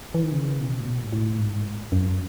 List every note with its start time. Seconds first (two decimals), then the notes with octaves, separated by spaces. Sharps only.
0.14 E3
0.23 D#3
0.32 C#3
0.59 B2
0.80 A2
0.86 B2
1.02 G#2
1.13 A2
1.39 G#2
1.92 F#2